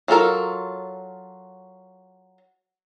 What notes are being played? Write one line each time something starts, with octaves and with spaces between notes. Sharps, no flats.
F#3 F4 A4 A#4